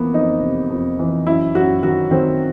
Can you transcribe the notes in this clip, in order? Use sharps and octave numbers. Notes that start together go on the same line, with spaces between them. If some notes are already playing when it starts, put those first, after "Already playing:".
Already playing: F2 E3 A#3 B3
F2 D#4
C3
F2
E3
F#2 E4
F#2 F#4
D#3 F#4
D#3 C4